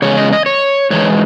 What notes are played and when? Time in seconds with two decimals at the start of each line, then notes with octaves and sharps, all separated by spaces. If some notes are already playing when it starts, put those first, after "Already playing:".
0.02 E2 C#3 G#3 C#5
0.17 D#5
0.32 D#5
0.46 C#5
0.90 G#2 E3 G#3 C#5